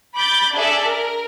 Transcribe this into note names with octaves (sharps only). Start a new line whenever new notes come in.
B5 D6 G6 A6
D4 G#4 A4 D5 E5
A#4